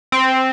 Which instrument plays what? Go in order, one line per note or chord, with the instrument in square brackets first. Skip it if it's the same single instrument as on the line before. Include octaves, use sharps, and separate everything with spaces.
[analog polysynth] C4